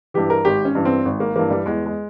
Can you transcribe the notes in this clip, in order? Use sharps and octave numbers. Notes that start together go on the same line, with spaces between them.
G2 E3 G4
A#4
G#1 G4
C#4
G2 E3
C4
G#1
A#3
G2 E3 A#3
G3
E2 G#3
G#3